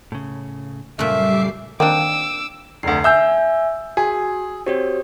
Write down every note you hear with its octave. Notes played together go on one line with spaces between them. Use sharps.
A2 C#3
F#2 A#2 C#3 G3 A3 E5 D6 C7
D#3 A#3 C4 D4 G5 D6 E6
F1 D2 C7
E5 G#5 E6 G6
F#4 G#4
C4 F#4 G4 C#5